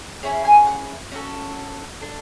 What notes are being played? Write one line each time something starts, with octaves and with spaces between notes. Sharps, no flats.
C#4 E4 G#4 C#5
G#5
F#5
C#4 F#4 A4
D4 A4